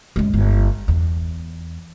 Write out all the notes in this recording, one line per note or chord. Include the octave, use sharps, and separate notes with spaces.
F#2 G#3
G1
E2